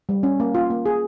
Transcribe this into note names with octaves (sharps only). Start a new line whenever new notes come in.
G3
C#4
A#3
F4
A#3
G#4